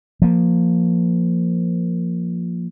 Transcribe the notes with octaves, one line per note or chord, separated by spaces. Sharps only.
F3 A#3